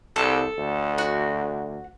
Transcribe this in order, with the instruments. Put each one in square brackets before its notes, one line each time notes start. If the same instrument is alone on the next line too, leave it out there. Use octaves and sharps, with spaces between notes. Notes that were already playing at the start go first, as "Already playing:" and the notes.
[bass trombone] C2 [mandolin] A4
[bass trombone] D2
[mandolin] F#4